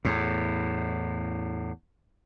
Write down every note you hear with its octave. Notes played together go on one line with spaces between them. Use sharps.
E2 A2